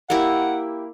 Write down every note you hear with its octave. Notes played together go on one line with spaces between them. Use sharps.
A#3 E4 G4 F#5